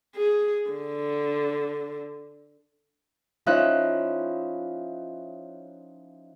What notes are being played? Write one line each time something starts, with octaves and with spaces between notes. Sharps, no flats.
G#4
D3
F3 C#4 D#4 E4 E5 F#6